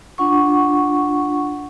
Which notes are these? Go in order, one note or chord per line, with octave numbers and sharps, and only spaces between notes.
D4 F4 F#5 C#6